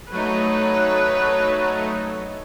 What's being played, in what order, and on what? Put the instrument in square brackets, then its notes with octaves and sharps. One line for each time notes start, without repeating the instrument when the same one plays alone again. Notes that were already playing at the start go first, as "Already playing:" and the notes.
[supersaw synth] F#3 A3 D#4 [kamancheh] A4 C#5 [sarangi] B4